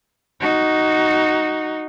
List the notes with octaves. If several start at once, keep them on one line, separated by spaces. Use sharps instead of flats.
D#4 F#4